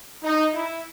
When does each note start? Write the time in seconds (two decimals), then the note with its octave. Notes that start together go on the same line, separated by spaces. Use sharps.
0.23 D#4
0.54 E4